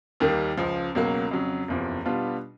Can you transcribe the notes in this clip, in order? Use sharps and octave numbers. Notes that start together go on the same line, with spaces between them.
D#2 D#3 G3 A#3
C#2 C#3 F3
C#2 B2 F#3 A#3
F2 C#3 F#3
F#1 E2 C3 F3
B2 G3 B3 D4 F4